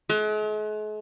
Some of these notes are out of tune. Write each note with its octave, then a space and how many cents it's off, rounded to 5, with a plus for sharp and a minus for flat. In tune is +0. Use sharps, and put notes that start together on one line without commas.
G#3 +45